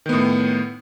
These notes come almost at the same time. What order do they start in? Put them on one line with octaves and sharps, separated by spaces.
D#3 B3 A2